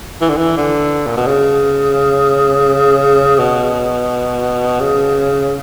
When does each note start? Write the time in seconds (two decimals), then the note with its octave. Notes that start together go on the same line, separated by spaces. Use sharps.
0.21 E3
0.30 D3
0.37 E3
0.57 D3
1.06 A#2
1.16 B2
1.27 C#3
3.39 B2
4.81 C#3